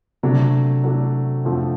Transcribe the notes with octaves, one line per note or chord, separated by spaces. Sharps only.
C3 F#3 A3 D4
F#3 A3 D4
F2 D3 F3 A3 C4